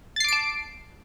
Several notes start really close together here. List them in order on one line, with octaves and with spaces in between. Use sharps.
A6 C7 D6 D7 A5